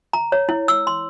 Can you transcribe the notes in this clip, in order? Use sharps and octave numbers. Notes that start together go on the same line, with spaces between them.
A#5
C#5
E4
E6
C6